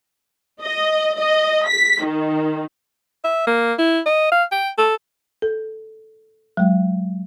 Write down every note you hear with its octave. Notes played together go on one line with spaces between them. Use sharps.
D#5
D#5
B6
D#3
E5
A#3
E4
D#5
F5
G5
A4
A4
F#3 G#3